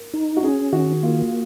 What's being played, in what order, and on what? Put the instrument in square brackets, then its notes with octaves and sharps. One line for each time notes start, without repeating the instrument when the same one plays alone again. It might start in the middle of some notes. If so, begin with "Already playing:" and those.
Already playing: [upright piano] A#4
[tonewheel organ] D#4
[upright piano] F#4
[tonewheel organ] C#4 [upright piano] G#4
[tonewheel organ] D#3 [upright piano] F#4
[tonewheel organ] A#3 [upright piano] F4